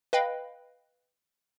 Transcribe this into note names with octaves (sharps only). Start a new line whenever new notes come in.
B4 D#5 F5 G5 B5